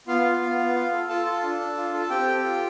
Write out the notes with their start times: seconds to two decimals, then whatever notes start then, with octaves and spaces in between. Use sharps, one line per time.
0.07 B3 F4 F5
0.25 B3
0.42 B3
0.58 B3
0.75 F4
0.92 A4
1.09 F4 A4 A5
1.26 F4
1.43 D4
1.60 D4
1.77 F4
1.94 A4
2.02 A5
2.10 C4 G4 G5
2.27 A4
2.44 F4